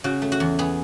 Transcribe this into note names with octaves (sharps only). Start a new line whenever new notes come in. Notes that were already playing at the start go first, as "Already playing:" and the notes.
C#3 F#4
A3
F#4
E2
B3 G#4